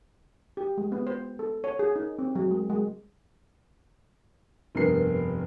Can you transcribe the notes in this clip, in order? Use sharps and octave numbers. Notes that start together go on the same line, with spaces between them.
G4
G#3
B3
C5
A4
C#5
G#4
D#4
C4
F#3
G#3
G#3
F1 G2 B3 A#4 C7